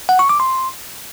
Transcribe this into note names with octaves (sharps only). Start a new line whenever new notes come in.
F#5
C#6
D6
C6